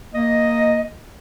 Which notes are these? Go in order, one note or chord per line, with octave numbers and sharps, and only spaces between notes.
A#3 D#5